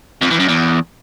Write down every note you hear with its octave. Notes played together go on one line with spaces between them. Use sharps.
F2
E2
F#2
E2